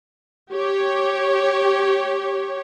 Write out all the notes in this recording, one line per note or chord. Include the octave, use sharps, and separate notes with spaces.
G4 C#5